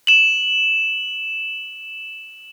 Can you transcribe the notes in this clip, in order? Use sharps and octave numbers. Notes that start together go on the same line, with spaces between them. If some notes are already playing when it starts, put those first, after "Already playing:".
E7 F#7